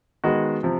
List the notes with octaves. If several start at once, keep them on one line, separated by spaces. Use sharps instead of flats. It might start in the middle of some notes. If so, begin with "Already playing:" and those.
D#3 G#3 B3 D#4 F#4
C3 F3